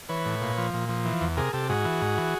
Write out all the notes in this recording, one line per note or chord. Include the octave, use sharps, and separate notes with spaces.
E3 B4 C#5
A2
A#2
F3
A#2
F3
E3
E2
C3 G#4 A#4
C3 G4 A4
G#2 F#4 G#4
E3
G#2
E3